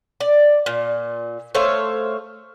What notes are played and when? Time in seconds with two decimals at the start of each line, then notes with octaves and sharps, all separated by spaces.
0.20 D5
0.66 A#2
1.55 A3 C5 C#5 F5